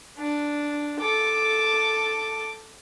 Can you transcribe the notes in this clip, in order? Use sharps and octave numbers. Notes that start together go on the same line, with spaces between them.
D4
A4 D6